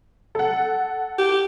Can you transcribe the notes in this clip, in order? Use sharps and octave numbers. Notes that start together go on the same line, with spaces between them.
A4 F#5
G4